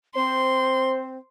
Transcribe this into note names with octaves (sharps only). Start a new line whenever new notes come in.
C4 C5 C6